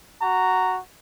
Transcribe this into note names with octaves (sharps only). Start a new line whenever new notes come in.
F#4 A#5